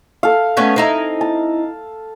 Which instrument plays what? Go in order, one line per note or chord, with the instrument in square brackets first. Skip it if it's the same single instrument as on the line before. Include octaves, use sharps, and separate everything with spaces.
[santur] A4 F5
[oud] A3 B3 C#4
C4 D#4 E4
[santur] A5